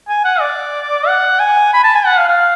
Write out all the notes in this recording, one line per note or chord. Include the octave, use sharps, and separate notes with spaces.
G#5
F#5
D5
F#5
G#5
B5
A5
G#5
F#5
F5
F5